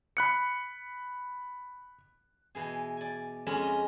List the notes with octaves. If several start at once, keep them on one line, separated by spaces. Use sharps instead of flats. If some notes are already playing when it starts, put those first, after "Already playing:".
B5 F#6 C#7
B2 E3 G#4
D5 G#5
F2 G#3 C#4 A#5 B5
D#5